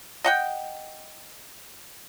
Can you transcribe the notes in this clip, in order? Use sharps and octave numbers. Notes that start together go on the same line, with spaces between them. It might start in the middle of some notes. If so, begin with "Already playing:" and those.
D#5 F#5 G5